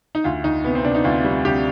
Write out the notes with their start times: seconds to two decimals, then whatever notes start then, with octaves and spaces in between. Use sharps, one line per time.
0.15 D#4
0.24 D2 F4
0.44 D2 D#4
0.64 C3 B3
0.75 C4
0.84 C3 D4
0.95 D#4
1.04 D2 F4
1.24 G3
1.45 D2 G4